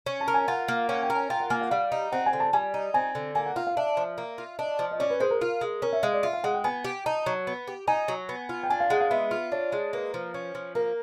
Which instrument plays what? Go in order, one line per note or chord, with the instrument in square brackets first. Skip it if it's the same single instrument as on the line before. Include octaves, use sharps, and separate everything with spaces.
[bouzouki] C#4
[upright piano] A5
[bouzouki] A#4
[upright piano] G#5
[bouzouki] F4 [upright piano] F#5
[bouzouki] A#3
[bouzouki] C#4 [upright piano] F#5
[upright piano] G5
[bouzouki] A#4
[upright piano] G#5
[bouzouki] F4 [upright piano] G5
[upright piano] F#5
[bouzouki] A#3 [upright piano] G#5
[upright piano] F#5
[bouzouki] G3 [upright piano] F5
[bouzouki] D#4
[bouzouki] C4 [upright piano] F#5
[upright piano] G#5
[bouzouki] D3
[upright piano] A5
[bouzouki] G3 [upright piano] G#5
[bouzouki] D#4
[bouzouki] C4 [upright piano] G#5
[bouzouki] D3
[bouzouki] A#3 [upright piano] G#5
[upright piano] F#5
[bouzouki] F4 [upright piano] F5
[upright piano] F5
[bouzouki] D4 [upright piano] E5
[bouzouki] F3
A#3
F4
[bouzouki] D4 [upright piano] D#5
[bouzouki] F3
[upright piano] D#5
[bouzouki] C#4 [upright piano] D5
[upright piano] B4
[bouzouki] G#3 [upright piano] C5
[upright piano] A#4
[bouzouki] F4 [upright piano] A#4
[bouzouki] G#3
[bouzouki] C#4 [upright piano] A#4
[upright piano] E5
[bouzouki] G#3 [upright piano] F5
[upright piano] D5
[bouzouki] F4 [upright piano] E5
[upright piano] F5
[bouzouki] G#3 [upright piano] F#5
[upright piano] G5
[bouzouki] B3 [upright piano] G#5
[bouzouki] G4
[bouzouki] D#4 [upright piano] A5
[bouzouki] F#3
B3
G4
[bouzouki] D#4 [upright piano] G#5
[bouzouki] F#3
B3
F4
[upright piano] G5
[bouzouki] D4 [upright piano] G#5
[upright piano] F5
[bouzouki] G#3 [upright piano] F#5
[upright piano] F5
[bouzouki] B3 [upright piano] E5
[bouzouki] F4
[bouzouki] D4 [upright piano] C#5
[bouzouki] G#3
[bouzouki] A#3 [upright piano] B4
[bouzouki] F3
C#4
F3
[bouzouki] A#3 [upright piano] A#4